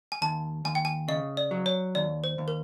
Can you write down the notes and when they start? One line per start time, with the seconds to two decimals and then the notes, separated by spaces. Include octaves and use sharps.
0.12 G#5
0.22 D#2 A5
0.65 D#2 G#5
0.75 G5
0.85 G#5
1.08 C#3 D#5
1.37 D5
1.51 F#3
1.66 C#5
1.95 D#2 D5
2.24 C5
2.38 D#2
2.48 A#4